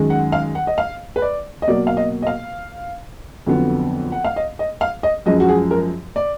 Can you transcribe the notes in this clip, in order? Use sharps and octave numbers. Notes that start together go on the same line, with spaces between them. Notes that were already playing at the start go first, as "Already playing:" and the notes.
Already playing: F#2 D#3 G#3
F#5
F5
F#5
D#5
F5
B4
D5
D#5
B2 F#3 A#3 D5
F5
D#5
D#5
F5
F2 D3 F#3 B3
F#5
F5
D#5
D#5
F5
D#5
F#2 F3 G#3 D#5
F#4
G#4
A#4
D5